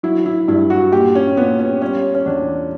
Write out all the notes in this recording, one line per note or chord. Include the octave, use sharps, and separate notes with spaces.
F#3 E4
E4
G2 E4
F#4
A#2 G4
C#4
A#2 B3
C#4
G3 C#4
C#4
E2 D4